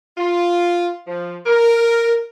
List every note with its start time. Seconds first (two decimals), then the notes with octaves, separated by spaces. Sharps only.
0.17 F4
1.06 F3
1.46 A#4